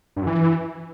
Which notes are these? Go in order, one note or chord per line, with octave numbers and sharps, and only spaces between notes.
G2
F#2
E3